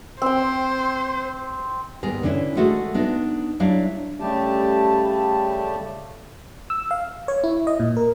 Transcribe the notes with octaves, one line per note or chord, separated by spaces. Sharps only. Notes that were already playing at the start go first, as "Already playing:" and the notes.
C4 C5 G5
D#2 G#2 G3 B3 G#4 A#4
D3 E3 C#4 D4 E4
G#3 A3 F#4 G#4 A4
B3 D4 D#4 D#5
F#3 G3 D4 E4 F5
C#3 G3 A3 G4 A5
E6
F5
C#5
E4
D#5
A#2
A#4